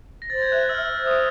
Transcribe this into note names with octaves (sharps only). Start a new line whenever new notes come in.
A#6
C5 A6
G#6
E5 F#6
F#6
E6
E5 F6
E6
C5
D#6